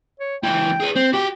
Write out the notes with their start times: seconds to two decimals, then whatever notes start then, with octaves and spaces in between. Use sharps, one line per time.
0.20 C#5
0.43 C#2 E3 G5
0.80 G#4 B4
0.96 C4 C5
1.13 F#4 G4 G5